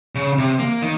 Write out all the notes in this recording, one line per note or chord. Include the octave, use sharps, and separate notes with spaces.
C#3
C3
A#3
D#3